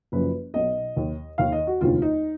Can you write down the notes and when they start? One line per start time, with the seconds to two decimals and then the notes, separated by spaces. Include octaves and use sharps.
0.12 F#1 F#2 F3 B4
0.54 B1 B2 D#5
0.97 D#2 D#3
1.38 D#2 D#3 F5
1.52 D#5
1.67 F#4
1.81 F1 D#2 D3 F4
2.02 D#4